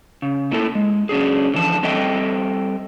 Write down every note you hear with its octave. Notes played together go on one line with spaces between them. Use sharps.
C#3
A3 A#3 E4 F#4 A4
G#3
F#3 C#4 D4 G#4
D3 E3 F3 A5
G3 C4 A4 D#5 E5 G5